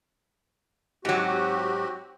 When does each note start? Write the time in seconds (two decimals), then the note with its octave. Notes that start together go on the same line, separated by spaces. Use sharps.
1.05 G#2 F#3 C4 F#4 G4